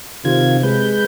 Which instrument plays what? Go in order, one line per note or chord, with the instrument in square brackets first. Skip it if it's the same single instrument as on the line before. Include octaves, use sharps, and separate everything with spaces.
[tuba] C3 [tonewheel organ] D#3 F4 G#6
[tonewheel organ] G#3 B4 G6